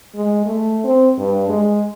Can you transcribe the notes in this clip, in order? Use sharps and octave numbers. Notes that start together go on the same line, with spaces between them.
G#3
A3
C4
G2
G#3